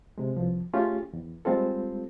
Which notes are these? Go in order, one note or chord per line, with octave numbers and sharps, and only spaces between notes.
C3 G#3
C2 F3
A3 C#4 F4 G4 G#4
E2
G3 G#3 C4 F4 A4